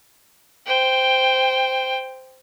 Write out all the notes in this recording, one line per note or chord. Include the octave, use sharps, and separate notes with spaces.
C5 G5